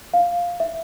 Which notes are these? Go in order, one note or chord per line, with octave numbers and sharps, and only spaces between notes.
F5
E5